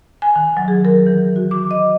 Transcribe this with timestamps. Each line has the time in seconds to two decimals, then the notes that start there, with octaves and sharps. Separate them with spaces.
0.22 G#5
0.36 D#3
0.57 F#3
0.68 G#4
0.85 A#4
1.07 E3
1.36 F#4
1.51 D6
1.71 D#5